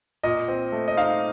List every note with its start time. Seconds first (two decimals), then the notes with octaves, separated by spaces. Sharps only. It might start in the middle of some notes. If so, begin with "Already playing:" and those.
0.23 A#2 D#5
0.48 C4
0.72 A3
0.88 D#5
0.97 D#4 F5